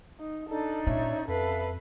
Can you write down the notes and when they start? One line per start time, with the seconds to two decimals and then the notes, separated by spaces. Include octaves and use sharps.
0.20 D#4
0.49 D4 D#4 A4 D5
0.87 A#2 C#4 C#5 E5
1.28 F2 A4 B4 E5 F5